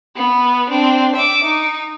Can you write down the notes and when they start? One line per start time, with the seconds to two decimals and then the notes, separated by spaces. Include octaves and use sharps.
0.16 B3 B4
0.70 C4 D4
1.16 E5 D6
1.44 D#4